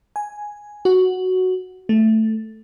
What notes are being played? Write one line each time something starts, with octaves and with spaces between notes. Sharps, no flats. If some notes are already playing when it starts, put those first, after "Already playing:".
G#5
F#4
A3